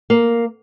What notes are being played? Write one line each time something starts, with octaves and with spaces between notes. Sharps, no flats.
A#3